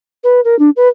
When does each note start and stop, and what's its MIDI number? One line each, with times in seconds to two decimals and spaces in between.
0.24 0.41 71
0.45 0.58 70
0.59 0.70 62
0.77 0.88 71